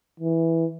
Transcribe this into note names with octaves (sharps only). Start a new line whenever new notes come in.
E3